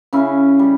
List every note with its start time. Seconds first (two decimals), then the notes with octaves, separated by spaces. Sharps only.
0.13 C#3 C#4 E4
0.59 G3